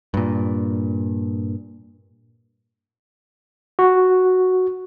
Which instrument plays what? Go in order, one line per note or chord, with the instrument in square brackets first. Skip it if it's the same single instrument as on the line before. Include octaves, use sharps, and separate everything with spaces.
[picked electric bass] G2 A#2
[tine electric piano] F#4